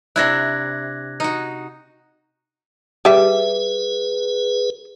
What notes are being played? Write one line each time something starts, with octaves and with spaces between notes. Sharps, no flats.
C3 D4 E4 F#6 G#6 A#6
D#4 F#4
G3 G#4 B4 E5